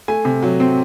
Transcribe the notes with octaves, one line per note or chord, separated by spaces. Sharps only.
A3 G#5
C3
F#3
C4